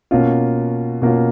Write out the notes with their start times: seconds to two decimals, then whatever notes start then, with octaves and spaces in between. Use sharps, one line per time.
0.11 B2 A#3 C#4 F4
1.02 B2 A#3 C#4 F4